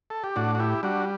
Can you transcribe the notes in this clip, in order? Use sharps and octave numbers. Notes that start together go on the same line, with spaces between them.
A4
G4
A2 D4 F#4
F#4
E4 G4
G3 D4 F#4